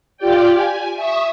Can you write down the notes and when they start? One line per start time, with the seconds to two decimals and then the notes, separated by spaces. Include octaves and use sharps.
0.17 F4 G4 D5 G5
0.51 G#5
0.96 E5 C#6 D#6